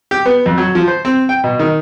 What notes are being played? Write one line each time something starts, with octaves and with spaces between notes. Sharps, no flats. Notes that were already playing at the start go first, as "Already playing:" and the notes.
G4
B3
F2
F#3
F3
C5
C4
G5
B2
D#3